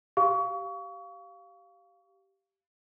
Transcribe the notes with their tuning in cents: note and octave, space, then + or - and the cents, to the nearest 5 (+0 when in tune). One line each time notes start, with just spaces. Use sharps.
G4 -15 F5 +0 C#6 +30